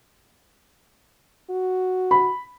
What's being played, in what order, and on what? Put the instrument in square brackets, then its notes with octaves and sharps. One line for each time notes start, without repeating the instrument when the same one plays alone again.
[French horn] F#4
[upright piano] B5